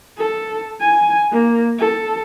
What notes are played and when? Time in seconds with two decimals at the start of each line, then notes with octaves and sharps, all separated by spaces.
0.18 A4
0.81 G#5
1.32 A#3
1.79 A4